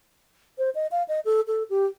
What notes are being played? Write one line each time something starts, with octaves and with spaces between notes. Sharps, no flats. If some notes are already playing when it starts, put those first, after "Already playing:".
C5
D#5
F5
D#5
A4
A4
G4